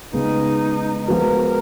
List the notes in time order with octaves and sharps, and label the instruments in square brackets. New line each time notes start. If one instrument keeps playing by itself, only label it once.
[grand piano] C#3 G#3 B3 [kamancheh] D#4
[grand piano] F3 G#3 B3 F#4 B4 [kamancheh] A#4